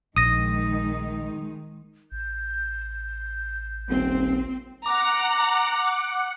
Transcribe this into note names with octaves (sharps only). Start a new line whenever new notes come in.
A#1 D#3 G#3 D#4 D#6 A#6
A1 G6
D#1 C4
F#5 A#5 D6